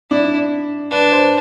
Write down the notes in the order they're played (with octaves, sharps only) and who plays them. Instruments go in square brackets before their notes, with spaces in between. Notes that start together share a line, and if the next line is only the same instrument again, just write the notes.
[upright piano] D4 [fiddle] E4
[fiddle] D4 [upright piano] B4
[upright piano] C5